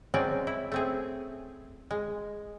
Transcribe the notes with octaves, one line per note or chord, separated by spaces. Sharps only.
F#3 G#3 C4 C#4 D5
E4
A3 C4 G#4
G#3